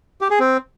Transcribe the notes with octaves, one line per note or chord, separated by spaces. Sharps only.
G4
G#4
C4